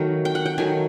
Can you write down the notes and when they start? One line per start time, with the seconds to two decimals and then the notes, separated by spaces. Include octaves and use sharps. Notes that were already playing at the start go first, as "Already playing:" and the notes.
Already playing: D#3 F#3 A3
0.25 G5
0.35 F#5
0.46 G5
0.58 D#3 F#3 A3 G#5